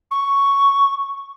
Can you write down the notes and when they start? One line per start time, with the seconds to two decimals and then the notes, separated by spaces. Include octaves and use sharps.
0.11 C#6